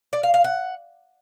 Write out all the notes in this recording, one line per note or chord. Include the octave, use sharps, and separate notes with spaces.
D5
F5
F5
F#5